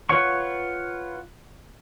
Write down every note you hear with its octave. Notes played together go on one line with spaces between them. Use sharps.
F4 B4 C#5 F#5 C#6